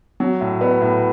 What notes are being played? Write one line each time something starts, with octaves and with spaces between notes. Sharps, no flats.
F#3
A2
B3
A2